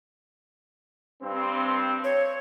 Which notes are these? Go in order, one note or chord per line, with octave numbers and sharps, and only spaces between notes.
G2 C4
C#5